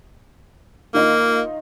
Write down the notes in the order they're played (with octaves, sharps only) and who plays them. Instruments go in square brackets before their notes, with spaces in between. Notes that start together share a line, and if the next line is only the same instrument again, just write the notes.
[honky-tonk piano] D#3 D#4 F4 [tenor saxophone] A#3